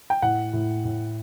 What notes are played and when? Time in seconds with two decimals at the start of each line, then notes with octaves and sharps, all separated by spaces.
0.10 G5
0.22 A2 F#5
0.53 A2
0.85 A2